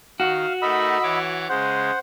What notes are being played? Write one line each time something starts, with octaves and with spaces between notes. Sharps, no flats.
D#3 F#4 F5
A3 D#4 A#4 D#5 B5 E6
E3 C#5 D6
C#3 G#3 C5 F#5